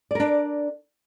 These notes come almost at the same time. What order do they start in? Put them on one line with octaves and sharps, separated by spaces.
D5 A#4 D4